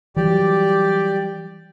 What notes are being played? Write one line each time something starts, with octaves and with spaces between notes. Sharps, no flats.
E3 F#3 G3 G4 D5